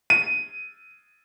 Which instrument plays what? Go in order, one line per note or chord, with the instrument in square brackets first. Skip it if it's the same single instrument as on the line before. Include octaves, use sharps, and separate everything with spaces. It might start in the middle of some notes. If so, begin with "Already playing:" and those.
[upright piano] D#7